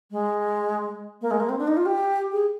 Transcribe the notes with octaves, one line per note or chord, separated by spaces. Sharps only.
G#3
A#3
G#3
A#3
C4
D4
D#4
F4
G4
G#4